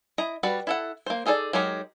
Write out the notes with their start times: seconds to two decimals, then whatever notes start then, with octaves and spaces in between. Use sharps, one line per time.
0.18 E4 D#5 A#5
0.43 G3 F#4 B4 A5
0.67 E4 A4 F#5
1.06 A#3 C5
1.26 D#4 G#4 A4 C5 D5
1.53 F#3 G#3 D#4 G4 A#4